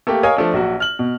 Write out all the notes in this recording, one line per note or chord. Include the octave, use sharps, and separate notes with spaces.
A3 A#3 G4
A#4 C#5 D#5 F5 G#5
F3 A3 D4
A#1 F#3 F#4
F6 F#7
B2